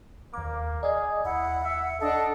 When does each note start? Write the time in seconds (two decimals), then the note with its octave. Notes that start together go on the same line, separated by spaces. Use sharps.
0.34 D#2 A#3 D6
0.83 G#4 D5 D#5
1.25 D#2 E4 F#5
1.64 E5
2.01 D4 A4 D#5